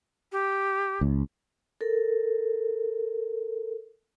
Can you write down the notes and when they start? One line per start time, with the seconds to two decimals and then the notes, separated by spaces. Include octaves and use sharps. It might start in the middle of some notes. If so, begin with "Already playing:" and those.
0.32 G4
1.01 C#2
1.81 A4 A#4